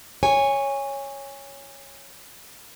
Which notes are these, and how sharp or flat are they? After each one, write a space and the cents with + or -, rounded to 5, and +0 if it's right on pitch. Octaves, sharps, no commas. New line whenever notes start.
C#5 +0 G#5 -20